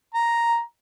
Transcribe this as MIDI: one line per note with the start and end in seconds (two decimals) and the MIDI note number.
0.14 0.60 82